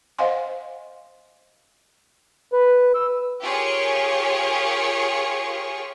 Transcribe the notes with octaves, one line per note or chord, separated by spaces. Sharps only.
C5 D#5 F5 F#5 G#5 C6
B4
E6
F4 G4 G#4 A#4 C#5 C#6